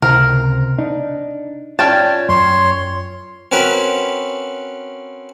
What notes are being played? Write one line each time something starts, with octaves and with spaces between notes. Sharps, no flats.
C#2 C3 A#4 C5
D4 D#4
C#4 F4 D5 G5 A5
F#2 C#5 C6
C4 C#4 F#4 A#4 B4